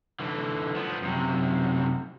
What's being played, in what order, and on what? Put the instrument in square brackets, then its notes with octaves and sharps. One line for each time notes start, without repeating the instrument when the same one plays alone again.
[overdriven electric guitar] D3 E3
F3 B3
F#2 C3